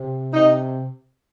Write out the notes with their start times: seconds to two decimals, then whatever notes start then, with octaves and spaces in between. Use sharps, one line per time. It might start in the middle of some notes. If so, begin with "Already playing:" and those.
Already playing: C3
0.33 C3 D#4